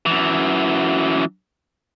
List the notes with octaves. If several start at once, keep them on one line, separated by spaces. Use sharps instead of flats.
F#2 E3